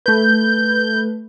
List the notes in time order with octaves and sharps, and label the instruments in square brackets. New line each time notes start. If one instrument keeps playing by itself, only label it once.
[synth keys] A3 B4 [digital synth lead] G6